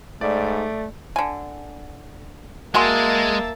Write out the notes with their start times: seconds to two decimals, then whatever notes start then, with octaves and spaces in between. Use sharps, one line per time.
0.21 G#2 A3 D5
1.16 D3 G#5
2.74 G#3 A#3 F#4 E5 G#5 A5 C6